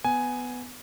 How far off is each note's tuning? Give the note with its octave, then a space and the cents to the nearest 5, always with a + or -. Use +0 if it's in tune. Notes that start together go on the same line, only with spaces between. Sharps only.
B3 +10 G#5 +5